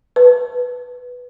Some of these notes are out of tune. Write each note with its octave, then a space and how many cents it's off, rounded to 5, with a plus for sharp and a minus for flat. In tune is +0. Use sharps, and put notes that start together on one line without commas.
B4 +0 A5 +0